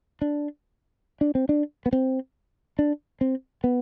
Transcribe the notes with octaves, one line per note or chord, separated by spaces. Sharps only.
D4
D4
C4
D4
B3
C4
D4
C4
B3